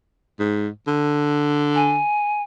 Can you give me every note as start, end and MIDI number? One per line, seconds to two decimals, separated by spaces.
0.40 0.68 44
0.87 2.01 50
1.75 2.43 80